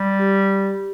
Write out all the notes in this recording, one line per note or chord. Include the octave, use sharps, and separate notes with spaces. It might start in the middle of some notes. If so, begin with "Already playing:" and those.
Already playing: G3
G4